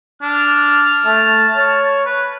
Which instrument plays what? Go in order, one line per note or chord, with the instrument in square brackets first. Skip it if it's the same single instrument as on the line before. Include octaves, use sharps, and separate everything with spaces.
[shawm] D4 [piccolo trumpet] F6
[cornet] A3 [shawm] A5
[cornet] C#5
[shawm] B4